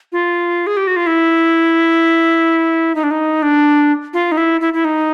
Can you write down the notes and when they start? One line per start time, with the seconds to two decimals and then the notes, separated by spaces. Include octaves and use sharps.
0.12 F4
0.67 G#4
0.77 G4
0.87 F#4
0.96 F4
1.07 E4
2.95 D#4
3.03 D4
3.11 D#4
3.42 D4
4.13 F4
4.32 D#4
4.37 E4
4.61 E4
4.74 E4
4.85 D#4